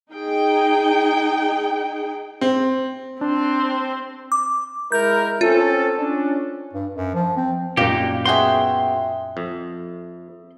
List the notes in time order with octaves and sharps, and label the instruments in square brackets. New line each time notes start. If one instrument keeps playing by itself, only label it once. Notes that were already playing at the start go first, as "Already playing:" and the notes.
[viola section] D#4 G#4 G5
[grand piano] C4
[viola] C4 C5 [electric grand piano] D4
[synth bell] D6
[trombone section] G#3 E4 A#4 [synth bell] G6
[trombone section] C4 C#4 A4 [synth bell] F4
[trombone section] C#4 D4
[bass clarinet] G2
F#2
F3
C4
[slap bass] F#2 A#2 [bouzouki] A#3 [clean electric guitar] D#4 G4
[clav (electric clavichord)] B2 F#4 G#4 [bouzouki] E5 G5 [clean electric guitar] C6
[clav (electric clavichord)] F2